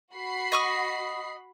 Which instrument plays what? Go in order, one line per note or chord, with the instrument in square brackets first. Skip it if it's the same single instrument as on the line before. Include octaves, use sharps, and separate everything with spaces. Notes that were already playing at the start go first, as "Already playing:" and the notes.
[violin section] F#4 B5 C7
[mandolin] D#5 C#6 D#6